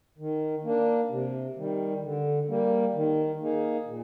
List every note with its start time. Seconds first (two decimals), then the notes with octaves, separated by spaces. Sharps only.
0.18 D#3
0.64 A#3 D4
1.10 C3
1.57 D#3 G3
2.02 D3
2.49 G3 A#3
2.95 D#3
3.40 A#3 D#4 G#4
3.87 A#2